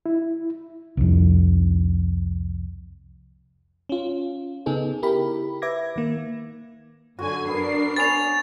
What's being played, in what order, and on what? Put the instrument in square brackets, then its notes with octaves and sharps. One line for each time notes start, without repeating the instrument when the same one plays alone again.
[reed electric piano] E4
[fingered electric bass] C2 F2
[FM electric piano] C#4 F4
C#3 B3 D#4 G#4 A4
E4 G4 A#4 B5
B4 E5 D6 G#6 A#6
D#3 A#3
[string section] F#2 D3 G#5 [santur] F#4
[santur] B3 [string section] D4 A#4 C7
[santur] B3 C#4 [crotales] A6 F7